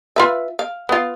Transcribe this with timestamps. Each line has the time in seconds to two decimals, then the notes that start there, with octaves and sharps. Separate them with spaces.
0.16 F4 B4 E5
0.59 F5
0.89 B3 F4